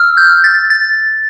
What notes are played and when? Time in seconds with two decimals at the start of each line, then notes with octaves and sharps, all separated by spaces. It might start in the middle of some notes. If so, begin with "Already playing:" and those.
Already playing: E6 F6
0.17 G6
0.44 A6
0.70 A6